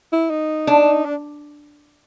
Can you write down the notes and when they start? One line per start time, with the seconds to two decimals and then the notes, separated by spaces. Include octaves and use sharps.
0.12 E4
0.30 D#4
0.67 D4
1.05 D4